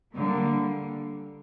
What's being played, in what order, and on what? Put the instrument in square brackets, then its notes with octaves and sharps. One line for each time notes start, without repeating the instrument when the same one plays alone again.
[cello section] D3 G3 A#3